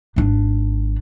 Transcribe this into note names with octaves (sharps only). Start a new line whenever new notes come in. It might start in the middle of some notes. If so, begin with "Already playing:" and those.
G#1 D4